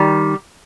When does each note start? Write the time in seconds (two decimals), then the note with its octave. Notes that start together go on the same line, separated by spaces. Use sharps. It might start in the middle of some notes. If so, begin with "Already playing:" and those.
Already playing: D#3 G3